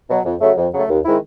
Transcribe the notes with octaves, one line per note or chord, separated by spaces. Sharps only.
B2 F#3
F2
C#3 F#3 A3
F2
C#3 F#3 A3
D#2
D#3 G#3 C4 E4